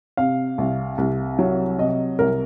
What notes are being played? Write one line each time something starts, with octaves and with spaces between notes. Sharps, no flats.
C3 F5
C2
C2
F#3
C3 D#5
C2 A#4